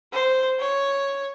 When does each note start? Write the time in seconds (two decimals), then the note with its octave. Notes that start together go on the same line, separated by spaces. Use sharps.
0.13 C5
0.59 C#5